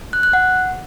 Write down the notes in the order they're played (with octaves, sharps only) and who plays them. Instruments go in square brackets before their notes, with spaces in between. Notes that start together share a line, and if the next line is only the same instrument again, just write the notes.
[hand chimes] F#6
F#6
F#5